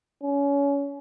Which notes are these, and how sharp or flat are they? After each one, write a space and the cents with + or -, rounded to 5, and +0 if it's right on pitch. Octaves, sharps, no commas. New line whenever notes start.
C#4 +25